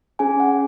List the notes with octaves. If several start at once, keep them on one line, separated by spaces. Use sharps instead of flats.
C#4 G#4 G#5
F#5